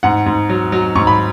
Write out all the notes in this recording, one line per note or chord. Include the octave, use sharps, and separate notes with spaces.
G#2 F#5
G#2
F#3
F#3
G#2 C#6
B5